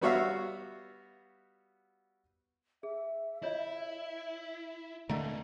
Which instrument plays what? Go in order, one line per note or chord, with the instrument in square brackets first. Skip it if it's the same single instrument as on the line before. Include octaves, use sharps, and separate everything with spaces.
[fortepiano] G3 B3 F#4 C#5 E5 F5
[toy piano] G#4 [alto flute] E5
[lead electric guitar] E4 [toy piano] F4 C#5 D#5
[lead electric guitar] C#2 A#2 [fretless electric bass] D3 A3 [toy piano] A#4 A5 A#5 [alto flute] D#5